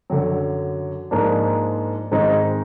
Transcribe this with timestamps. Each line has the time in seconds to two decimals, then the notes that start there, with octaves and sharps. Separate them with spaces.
0.10 F#2 D3 F#3
1.11 G#2 F3 A#3 D4
2.11 G#2 D#3 G#3 C4 D#4